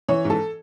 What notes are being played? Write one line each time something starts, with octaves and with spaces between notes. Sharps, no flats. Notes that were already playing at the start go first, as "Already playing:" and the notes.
E3 C#5
G#2
A4